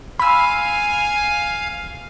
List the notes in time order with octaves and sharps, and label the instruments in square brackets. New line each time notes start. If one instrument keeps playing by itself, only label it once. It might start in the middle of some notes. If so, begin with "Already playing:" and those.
[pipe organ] F5 [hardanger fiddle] G#5 [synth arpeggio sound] B5 E6